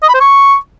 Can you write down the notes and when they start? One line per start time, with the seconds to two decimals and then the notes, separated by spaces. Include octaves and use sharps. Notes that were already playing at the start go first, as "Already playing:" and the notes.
0.03 D#5
0.09 B5
0.14 C5
0.20 C#6